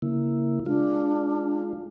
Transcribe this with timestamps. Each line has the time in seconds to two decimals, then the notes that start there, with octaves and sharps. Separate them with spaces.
0.02 C#3 A#3 E4
0.66 G#3 D4 F4